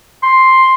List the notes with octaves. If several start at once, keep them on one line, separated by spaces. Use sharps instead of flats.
C6